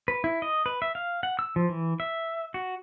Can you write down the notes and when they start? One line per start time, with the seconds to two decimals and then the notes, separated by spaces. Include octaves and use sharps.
0.08 B4
0.24 E4
0.42 D#5
0.66 B4
0.82 E5
0.95 F5
1.23 F#5
1.39 E6
1.56 F3
1.69 E3
2.00 E5
2.54 F#4